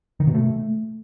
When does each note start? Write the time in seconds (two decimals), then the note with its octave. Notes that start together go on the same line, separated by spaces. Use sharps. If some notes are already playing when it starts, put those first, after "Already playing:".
0.20 D#3
0.27 B2
0.34 A3